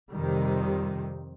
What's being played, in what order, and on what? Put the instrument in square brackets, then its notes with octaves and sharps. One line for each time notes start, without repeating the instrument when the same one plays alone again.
[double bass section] F2 C3 D#3 G3